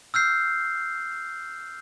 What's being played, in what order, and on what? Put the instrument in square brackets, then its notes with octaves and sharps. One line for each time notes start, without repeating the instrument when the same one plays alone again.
[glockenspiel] E6 F6 G6 C7